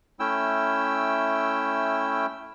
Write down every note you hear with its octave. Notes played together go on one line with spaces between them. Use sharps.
A3 C#4 E4 G5 E6